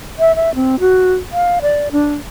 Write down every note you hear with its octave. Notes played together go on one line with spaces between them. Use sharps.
E5
E5
C4
F#4
F5
D5
D4